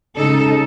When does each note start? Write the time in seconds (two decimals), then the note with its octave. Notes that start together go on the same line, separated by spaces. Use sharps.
0.15 C#3 G#3 D#4 A4